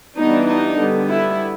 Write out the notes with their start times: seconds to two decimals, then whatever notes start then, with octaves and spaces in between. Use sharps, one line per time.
0.17 E3 G3 B3 D4 D#4
0.47 D#4
0.78 D3 G3 B3
1.08 E4